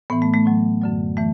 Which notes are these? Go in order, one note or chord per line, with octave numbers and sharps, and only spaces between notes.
A2 E3 B3
A3
A3
A2 F#3
F#2 D3 F#3
E3 A3